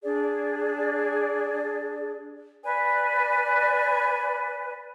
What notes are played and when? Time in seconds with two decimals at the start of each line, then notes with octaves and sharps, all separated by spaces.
0.02 D4 G#4 D5
2.63 B4 D5 G#5